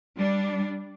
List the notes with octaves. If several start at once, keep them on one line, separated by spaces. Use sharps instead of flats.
G3 D4